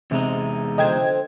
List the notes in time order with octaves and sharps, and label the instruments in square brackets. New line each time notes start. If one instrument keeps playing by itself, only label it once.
[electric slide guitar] E2 G#3 D#4 [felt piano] C3
[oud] D3 F3 D4 [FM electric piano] D#5 G5 G#6